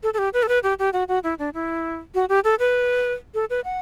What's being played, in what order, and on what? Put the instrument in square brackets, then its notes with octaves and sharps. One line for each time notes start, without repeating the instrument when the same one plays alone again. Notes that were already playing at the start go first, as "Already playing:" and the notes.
[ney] A4
A4
G4
B4
A4
B4
G4
G4
F#4
F#4
E4
D4
E4
F#4
G4
A4
B4
A4
B4
F#5